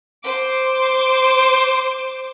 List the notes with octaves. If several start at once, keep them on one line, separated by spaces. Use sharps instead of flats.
C5 D6